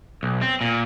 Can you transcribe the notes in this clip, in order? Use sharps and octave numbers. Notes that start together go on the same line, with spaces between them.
B1
C4
A#2